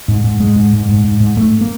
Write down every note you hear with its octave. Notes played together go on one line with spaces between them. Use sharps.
G#2
G#2
G#2 G#3
G#2
G#2
G#2
G#2
G#2
G#2 A3
A#3